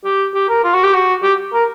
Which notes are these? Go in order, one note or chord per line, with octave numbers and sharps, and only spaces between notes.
G4
G4
A#4
F4
F#4
G4
F#4
G4
A#4